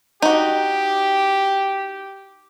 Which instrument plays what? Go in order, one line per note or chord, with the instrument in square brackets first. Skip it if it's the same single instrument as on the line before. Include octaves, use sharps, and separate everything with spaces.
[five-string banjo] D#4 F#4 [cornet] G4